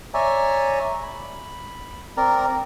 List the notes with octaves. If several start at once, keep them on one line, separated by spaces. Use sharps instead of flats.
C#5 D5 E5 G#5 A#5
B5
C4 A#4 D5 A#5